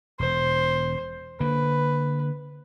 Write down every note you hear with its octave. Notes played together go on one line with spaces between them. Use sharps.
E1 C5
D3 A#3 B4